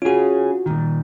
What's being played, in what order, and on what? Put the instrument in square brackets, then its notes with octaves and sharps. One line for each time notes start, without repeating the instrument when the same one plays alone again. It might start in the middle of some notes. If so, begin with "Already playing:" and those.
[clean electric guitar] C#4 G#4 [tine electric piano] F4 F#4
[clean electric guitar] A#2 D#3